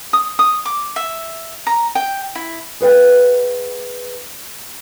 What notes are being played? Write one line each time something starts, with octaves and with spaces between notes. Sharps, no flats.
D#6
D#6
D6
E5
A#5
G5
E4
G#4 B4 F5 G5